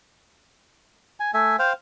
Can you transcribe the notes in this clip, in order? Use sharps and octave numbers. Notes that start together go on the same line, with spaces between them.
G#5
A3 E5 G#5
C5 F5 G5